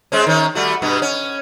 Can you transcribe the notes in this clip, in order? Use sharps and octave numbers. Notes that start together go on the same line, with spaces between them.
G#3 C4 C#4
D#3 C#4
G3 A3 F#4
G2 B2 B3
C#4